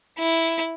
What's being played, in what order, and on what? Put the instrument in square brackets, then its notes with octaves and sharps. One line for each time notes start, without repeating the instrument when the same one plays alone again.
[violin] E4